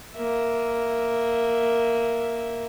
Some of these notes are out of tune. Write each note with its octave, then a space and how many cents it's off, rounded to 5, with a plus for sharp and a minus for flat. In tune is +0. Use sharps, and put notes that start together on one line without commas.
A#3 +0 E5 +0